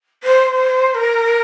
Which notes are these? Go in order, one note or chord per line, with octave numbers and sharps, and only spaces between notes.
C5
A#4